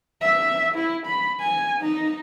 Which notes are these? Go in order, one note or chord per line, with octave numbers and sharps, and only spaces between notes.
E5
E4
B5
G#5
D#4